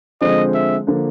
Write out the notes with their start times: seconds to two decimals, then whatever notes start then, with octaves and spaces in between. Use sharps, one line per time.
0.21 D3 F3 G#3 C4 D#5
0.54 E5
0.87 D3 F3 A#3 D4